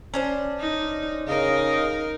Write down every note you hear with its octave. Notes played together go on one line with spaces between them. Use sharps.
C#4 D4 C5
D#4
C#3 D#4 A#4 D#5 F5